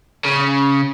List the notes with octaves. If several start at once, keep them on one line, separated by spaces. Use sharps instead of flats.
C#3